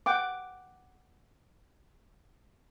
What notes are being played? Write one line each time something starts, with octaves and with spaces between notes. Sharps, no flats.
F#5 G5 D6